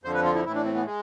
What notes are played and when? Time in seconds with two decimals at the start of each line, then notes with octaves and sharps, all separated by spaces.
0.04 F2 D3 F3 C5
0.14 B4
0.24 F4
0.35 E4
0.45 A2 E3 E4
0.55 D4
0.64 C4
0.74 B3
0.85 G#3